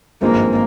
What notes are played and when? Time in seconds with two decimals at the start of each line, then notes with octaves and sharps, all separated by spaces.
0.21 G#1 G2 F3 G#3 A#3 C4